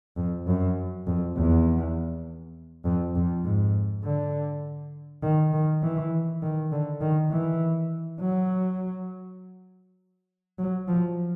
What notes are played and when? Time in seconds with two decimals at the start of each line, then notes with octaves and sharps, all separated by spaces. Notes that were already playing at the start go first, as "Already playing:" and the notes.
0.17 F2
0.47 F#2
1.07 F2
1.37 E2
2.85 F2
3.15 F2
3.44 G#2
4.04 D3
5.22 D#3
5.53 D#3
5.83 E3
6.42 D#3
6.72 D3
7.01 D#3
7.31 E3
8.20 F#3
10.59 F#3
10.88 F3